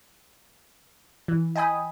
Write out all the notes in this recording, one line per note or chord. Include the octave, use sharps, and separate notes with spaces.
E3
D#5 G5 G#5 B5 D#6